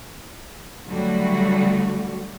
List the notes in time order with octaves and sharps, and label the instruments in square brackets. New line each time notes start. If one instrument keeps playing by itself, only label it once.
[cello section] D3 F#3 G3 A3 F#4